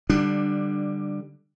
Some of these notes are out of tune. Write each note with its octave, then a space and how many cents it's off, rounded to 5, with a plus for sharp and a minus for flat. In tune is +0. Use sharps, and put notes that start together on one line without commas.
D3 +0 G3 +5 D4 +20